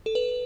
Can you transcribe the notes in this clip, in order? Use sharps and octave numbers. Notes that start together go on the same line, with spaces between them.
A4
B4